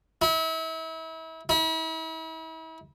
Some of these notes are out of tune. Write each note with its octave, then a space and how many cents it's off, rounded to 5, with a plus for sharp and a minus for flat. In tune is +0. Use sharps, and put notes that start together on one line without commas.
E4 -35
E4 -40